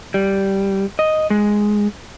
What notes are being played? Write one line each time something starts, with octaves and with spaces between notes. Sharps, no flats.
G3
D#5
G#3